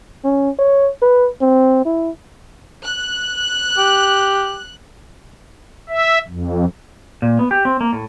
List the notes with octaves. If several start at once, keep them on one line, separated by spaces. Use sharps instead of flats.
C#4
C#5
B4
C4
E4
F#6
G4
E5
F2
A#2
B3
G4
C4
A#3
A2